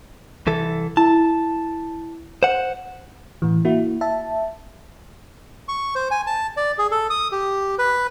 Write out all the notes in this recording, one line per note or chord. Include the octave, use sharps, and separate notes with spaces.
C2 E3 A4
E4 A5
C5 F#5
A2 E3
A#3 E4 F#4
E5 A5
C#6
C5
G#5
A5
D5
G#4
A4
D#6
G4
B4